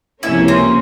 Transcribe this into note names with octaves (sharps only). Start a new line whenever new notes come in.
C#2 C3 F3 A#3 C#4 E4
C4